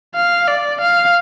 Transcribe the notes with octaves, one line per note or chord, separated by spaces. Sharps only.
F5
D5
F5